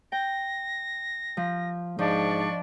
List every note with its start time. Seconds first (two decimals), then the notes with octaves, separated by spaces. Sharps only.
0.12 G5 A#6
1.37 F3
1.99 G#2 F3 D4 D5 D#5 C#6